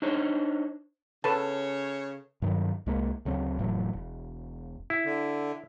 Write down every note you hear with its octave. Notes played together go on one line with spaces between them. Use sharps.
D4 D#4 C5 C#5
C#3 A4 B4 C#5 A5
G2 D#3 F#3
C2 G#3 A#3
D2 C#3 F#3 C4
F1 A2 E3 F#3
E1
E4
D3